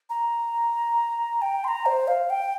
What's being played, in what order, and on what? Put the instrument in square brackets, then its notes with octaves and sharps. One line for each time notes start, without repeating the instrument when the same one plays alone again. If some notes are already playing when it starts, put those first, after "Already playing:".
[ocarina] A#5
G5
C6
A#5
C5
F5
G5